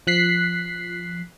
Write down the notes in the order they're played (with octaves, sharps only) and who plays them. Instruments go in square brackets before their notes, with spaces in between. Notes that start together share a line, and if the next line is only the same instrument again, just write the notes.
[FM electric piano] F3 F#6 B6 C7